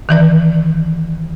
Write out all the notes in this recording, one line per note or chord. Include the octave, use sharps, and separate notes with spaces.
D#3 E3 D5